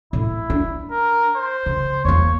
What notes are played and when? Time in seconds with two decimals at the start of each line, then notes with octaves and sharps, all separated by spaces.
0.13 A2 E4
0.50 D4
0.91 A#4
1.36 C5
1.66 C#3
2.05 E2 A#3 C#5